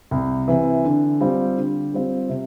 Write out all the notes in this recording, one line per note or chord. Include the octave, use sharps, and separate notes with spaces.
C2
C3 E3
D3
G3 C4 F4
D3
G3 C4 F4
C3